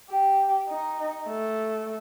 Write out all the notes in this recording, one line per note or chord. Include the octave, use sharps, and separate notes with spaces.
G4
D#4
A3